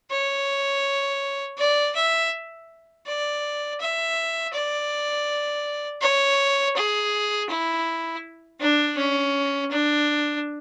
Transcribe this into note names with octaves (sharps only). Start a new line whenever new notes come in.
C#5
D5
E5
D5
E5
D5
C#5
G#4
E4
D4
C#4
D4